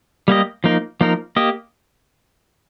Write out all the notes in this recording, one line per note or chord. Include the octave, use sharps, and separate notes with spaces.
G3 A#3 G4 D#5
F3 A#3 D#4 A#4
F3 A#3 D#4 A#4
A#3 G4 D#5